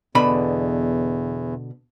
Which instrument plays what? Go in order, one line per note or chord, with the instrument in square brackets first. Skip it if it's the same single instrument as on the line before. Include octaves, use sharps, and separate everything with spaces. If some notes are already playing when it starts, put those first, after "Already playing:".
[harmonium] E2 [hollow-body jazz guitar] B2 D3 B5